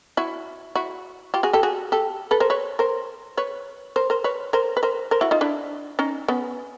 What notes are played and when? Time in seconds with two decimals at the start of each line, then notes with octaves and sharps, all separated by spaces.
0.17 E4 F#4
0.75 E4 F#4
1.34 F4 G4
1.43 F#4 G#4
1.53 G4 A4
1.63 F#4 G#4
1.92 G4 A4
2.31 A4 B4
2.40 A#4 C5
2.50 B4 C#5
2.79 A#4 C5
3.37 B4 C#5
3.96 A#4 C5
4.10 A#4 C5
4.24 B4 C#5
4.53 A#4 C5
4.77 B4
4.83 A#4 C5
5.11 A#4 C5
5.21 E4 F#4
5.31 D#4 F4
5.41 D4 E4
5.99 C#4 D#4
6.28 B3 C#4